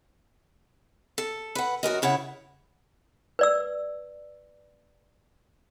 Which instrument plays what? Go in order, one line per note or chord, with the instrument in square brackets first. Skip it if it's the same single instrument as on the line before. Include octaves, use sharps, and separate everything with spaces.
[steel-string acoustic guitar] A4
B4 F#5
F#2 F#4 A#4 D#5
C#3 E4 C#5 F#5
[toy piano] B4 D5 E6